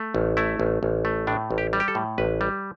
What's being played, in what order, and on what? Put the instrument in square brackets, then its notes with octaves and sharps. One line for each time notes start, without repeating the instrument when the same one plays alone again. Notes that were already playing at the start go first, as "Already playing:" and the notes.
Already playing: [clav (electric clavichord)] A3
A1
A3 E4
A1
A1
A3
A2 D4
A1
G4
G3
G4
A4
A2
A1 B4
G3